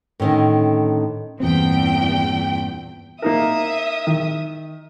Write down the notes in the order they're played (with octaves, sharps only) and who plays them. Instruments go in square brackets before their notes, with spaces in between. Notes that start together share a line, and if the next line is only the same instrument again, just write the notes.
[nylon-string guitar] A2 D3 D#3 C#4
[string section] E2 G5 [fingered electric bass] G2 A#2 C4
[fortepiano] A#3 D#4 A#4 [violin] E5 D#6
[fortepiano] D#3